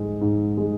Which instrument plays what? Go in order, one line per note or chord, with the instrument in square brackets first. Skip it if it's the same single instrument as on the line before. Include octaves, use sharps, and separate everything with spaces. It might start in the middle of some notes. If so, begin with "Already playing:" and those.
Already playing: [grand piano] G#2 G#3
G#2
G#3